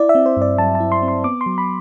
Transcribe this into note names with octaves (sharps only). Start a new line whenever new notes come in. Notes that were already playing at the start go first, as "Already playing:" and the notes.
Already playing: E4 D5
E5
C4
C5
G2 D5
F#3 A5
A5
E4
C6
C4
C6
B3 D6
C6
F#3
B5